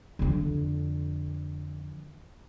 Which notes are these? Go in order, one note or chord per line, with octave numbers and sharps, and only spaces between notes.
F2 D3